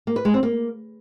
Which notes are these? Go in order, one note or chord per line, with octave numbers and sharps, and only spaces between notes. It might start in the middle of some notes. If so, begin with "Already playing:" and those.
A#3
B4
G#3
C4
A#3